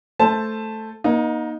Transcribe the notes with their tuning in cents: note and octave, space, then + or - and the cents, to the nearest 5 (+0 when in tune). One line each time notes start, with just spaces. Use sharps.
A3 +0 C5 +0 A5 +0
A#3 +35 D#4 +0